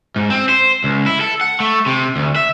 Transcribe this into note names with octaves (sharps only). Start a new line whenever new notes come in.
G#2
C4
C5
C#2
E4
A4
F#5
A3
C3
D2
E5